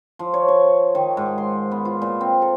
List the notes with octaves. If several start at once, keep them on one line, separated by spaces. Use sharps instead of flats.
F3
C#5
C#6
D#3
G#2
C6
B3
F4
A#2
C4
A4